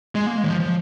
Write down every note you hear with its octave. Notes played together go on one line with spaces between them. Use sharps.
G#3
A#3
G#3
D#3
F3
F3